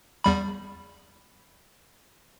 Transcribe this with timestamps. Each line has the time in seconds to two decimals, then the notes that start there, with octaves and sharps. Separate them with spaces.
0.24 E2 G3 B5